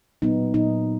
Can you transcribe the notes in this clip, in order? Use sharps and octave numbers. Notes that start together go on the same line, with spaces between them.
A#2 F#3 B3 D#4
A#2 F#3 B3 D#4